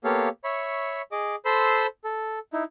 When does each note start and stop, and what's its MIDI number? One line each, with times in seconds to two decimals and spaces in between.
0.04 0.29 58
0.04 0.29 59
0.04 0.29 67
0.04 0.29 69
0.04 0.29 73
0.04 0.29 77
0.44 1.02 73
0.44 1.02 76
0.44 1.02 83
0.44 1.02 85
1.12 1.36 68
1.12 1.36 75
1.12 1.36 86
1.45 1.87 69
1.45 1.87 72
1.45 1.87 83
1.45 1.87 84
1.45 1.87 88
2.04 2.39 69
2.53 2.64 63
2.53 2.64 64